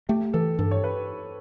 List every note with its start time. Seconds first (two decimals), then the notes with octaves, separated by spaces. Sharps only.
0.09 A3 G4
0.33 E3 A4
0.59 G2 A4
0.71 C#5
0.84 B4